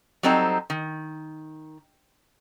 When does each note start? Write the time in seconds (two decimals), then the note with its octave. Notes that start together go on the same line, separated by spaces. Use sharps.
0.23 F#3 G3 C4 D#4 A4 C5
0.70 D#3